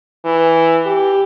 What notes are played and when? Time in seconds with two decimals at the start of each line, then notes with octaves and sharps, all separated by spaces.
0.25 E3
0.86 G4